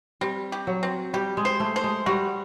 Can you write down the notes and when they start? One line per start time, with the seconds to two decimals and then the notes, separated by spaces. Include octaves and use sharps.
0.21 G3 C4
0.52 G4
0.67 F#3
0.83 C4
1.13 G3 G4
1.37 G#3
1.45 C5
1.60 A3
1.76 C5
1.84 G#3
2.06 G3 F#4